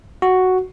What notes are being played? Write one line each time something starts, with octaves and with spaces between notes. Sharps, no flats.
F#4